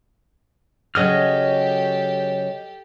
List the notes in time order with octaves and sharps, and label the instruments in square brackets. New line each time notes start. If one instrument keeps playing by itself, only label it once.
[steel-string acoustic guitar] C#3 F#3 C#5 [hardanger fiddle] G4 A4 [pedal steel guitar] D#5 D#6 F6